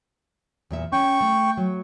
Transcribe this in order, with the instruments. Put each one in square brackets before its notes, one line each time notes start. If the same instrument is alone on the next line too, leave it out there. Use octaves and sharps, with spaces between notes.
[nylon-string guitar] E2 A#2 E5
[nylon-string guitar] C#4 [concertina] G5 C#6
[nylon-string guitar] A3
F#3